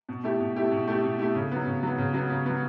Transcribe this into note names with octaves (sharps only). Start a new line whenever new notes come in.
B2
A3 E4 G4
B2
A3 E4 G4
B2
A3 E4 G4
B2
A3 E4 G4
C#3
F#3 B3
C#3
F#3 B3
C#3
F#3 B3
C#3
F#3 B3